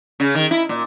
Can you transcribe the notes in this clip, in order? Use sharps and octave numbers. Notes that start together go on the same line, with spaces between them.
C#3
D#3
E4
A#2